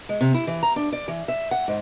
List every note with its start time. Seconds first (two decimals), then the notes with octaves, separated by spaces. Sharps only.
0.09 G#3
0.21 C3
0.34 E4
0.47 E3
0.63 A#5
0.76 D4
0.92 D5
1.08 E3
1.28 E5
1.51 F#5
1.68 G#2